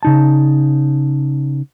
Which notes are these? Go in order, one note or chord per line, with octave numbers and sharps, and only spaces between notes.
C#3 D#4 A5